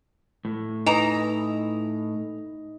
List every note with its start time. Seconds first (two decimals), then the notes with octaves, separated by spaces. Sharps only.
0.45 A2
0.86 E3 D#4 D#5 A#5